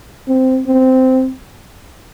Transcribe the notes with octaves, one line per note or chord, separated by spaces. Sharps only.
C4
C4